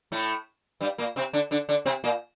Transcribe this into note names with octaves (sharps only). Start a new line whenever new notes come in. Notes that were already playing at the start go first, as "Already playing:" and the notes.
A2 A3
G2 G3
A#2 A#3
C3 C4
D3 D4
D3 D4
D3 D4
C3 C4
A#2 A#3